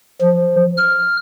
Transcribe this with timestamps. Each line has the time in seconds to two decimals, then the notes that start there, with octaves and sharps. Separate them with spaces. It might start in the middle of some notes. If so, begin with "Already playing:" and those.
0.21 F3
0.77 F6